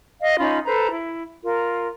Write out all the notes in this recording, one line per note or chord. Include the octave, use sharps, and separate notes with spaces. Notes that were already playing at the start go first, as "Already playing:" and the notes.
D#5 F5
C#4 D#4 F4 B5
A4 B4 C5 A#5
E4
F4 A#4